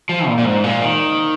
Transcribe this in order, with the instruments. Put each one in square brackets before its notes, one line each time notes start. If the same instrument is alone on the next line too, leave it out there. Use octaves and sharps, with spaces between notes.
[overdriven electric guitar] F3
A#2
A#2
G#2
A#2
D#3